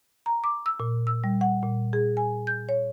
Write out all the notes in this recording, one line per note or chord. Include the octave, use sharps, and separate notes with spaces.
A#5
D6
E6
A#2
E6
G3
F#5
A#2
G#4
G#5
G6
C#5